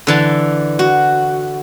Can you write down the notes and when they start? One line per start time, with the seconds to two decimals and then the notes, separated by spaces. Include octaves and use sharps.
0.07 D3 E3 A5
0.79 F#4